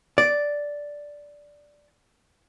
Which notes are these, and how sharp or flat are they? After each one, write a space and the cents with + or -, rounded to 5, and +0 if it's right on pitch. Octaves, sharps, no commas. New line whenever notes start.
D5 -5